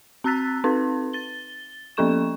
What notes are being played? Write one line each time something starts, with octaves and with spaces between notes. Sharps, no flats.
C4 A#5 E6 F#6 A6 B6
C4 D#4 B4
A6 G7
F3 A#3 C#4 A4 C#6 E7